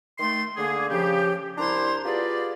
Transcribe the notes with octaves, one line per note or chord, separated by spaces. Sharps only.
D#3 A3 C6
D3 A#3 G#4
C#3 F3 G4
C2 D4 E4 C5 A#5 C6
B3 F4 G4 G#4 D5